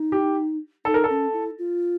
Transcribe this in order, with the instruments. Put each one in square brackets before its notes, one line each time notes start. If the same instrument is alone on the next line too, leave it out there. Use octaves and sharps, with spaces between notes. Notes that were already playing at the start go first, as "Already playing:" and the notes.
Already playing: [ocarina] D#4
[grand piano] G4
[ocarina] D#4 [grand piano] A4
[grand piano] A#4
A4
[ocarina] C#4
E4
F4